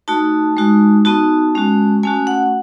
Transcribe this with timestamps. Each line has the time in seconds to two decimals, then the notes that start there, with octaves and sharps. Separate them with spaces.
0.08 A3 D#4 F#4 A5
0.57 G#3 D#4 F#4
1.05 B3 D#4 F#4 A5
1.55 G#3 C#4 F#4
2.03 A3 C#4 F#4 G#5
2.27 F#5